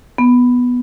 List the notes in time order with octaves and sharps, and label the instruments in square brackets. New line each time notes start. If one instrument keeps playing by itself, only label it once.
[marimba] B3